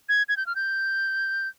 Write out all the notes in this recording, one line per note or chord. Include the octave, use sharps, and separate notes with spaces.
G#6
G#6
G6
F6
G6